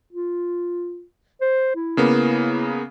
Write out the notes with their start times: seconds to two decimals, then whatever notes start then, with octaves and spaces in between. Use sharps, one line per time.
0.13 F4
1.41 C5
1.76 E4
1.97 C#3 A#3 B3